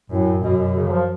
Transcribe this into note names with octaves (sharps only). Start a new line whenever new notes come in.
F#2 A2
F#2 B2
B2
C#3
F#3
F3